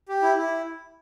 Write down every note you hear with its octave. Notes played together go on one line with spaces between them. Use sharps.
G4
E4
E4